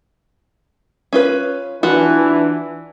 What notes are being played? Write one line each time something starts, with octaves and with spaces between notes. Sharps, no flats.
C#4 F4 B4
E3 D4 F4 F#4 B4